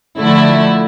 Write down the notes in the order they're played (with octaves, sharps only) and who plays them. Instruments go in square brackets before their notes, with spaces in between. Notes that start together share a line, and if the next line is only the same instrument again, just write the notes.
[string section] D3 F3 A3 E4